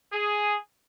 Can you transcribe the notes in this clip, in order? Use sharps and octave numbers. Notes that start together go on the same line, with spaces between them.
G#4